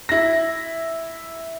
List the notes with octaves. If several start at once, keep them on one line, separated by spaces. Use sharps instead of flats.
E4 A#6